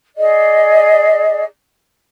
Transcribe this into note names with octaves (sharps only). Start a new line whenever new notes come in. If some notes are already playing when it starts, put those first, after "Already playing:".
G#4 D5 D#5